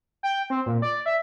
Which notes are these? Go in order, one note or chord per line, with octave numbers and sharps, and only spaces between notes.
G5
C4
A#2
D5
E5